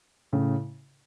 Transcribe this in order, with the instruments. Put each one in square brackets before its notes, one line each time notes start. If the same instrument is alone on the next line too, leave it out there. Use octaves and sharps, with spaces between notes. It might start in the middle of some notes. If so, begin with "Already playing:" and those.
[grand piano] A2 C#3